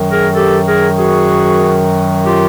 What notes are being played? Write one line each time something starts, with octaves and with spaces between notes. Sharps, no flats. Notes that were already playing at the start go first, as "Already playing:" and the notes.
Already playing: F#2 D#3 F#3
G#4 A#4
G4 A4
G#4 A#4
F#4 G#4
F4 G4